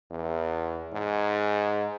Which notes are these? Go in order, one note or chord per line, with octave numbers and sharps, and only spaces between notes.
E2
G#2